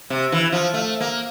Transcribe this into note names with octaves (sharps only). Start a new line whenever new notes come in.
C3
E3
F3
A3
A#3